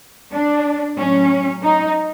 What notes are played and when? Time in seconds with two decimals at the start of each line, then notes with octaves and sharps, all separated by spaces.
0.32 D4
0.97 A2 F#3 C#4
1.63 D#4